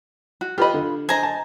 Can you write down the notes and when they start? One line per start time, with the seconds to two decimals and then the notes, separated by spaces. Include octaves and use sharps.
0.41 F#4
0.58 F4 G4 B4 D#5 B5
0.74 D3
1.09 C5 D#5 G#5 A#5
1.23 A5